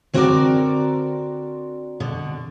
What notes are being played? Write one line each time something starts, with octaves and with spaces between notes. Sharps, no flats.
D3 C4 F#4 G4 A#4 D5
B2 D3